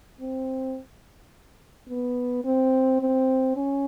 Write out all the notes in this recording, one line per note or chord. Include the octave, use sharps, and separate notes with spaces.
C4
B3
C4
C4
C#4